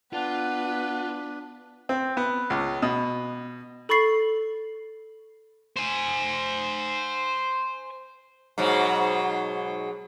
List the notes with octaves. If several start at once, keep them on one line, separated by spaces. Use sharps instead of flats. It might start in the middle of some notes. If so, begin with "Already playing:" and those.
B3 D4 F4 B4 F#5
C4
B3
C#2
B2
A4 B5 C#6 A6 C7 F#7
C5 G#5
G#2 B2 F#3